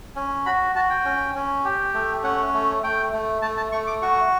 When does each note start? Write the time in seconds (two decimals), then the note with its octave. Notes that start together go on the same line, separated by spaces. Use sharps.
0.16 C#4
0.46 F#4 B5
0.75 F#4 A5
0.90 G5
1.05 C#4
1.35 C#4
1.65 G4
1.94 A3
2.24 C#4 F#5
2.53 A3
2.83 A3 G5
3.13 A3
3.42 A3 A5
3.57 A5
3.72 A3 C#6
3.87 D6
4.02 F#4 C#6